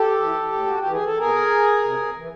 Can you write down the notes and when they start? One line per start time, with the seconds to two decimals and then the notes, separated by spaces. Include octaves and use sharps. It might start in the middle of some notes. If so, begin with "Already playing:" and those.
Already playing: G4 A4
0.20 E3
0.52 A2
0.66 F#4
0.79 G4
0.85 E3
0.91 G#4
1.05 A4
1.18 B2 G#4 A#4
1.84 C3
2.17 E3